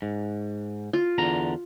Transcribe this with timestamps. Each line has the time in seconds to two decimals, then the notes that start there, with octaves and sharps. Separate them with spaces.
0.02 G#2
0.93 F4
1.18 E2 D3 A#5